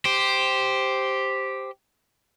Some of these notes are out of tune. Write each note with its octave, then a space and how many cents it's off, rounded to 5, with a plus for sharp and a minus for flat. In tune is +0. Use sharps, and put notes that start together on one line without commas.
G4 +0 C5 +0